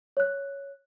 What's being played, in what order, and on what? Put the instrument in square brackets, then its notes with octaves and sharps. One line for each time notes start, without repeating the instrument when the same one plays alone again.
[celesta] C#5 F#6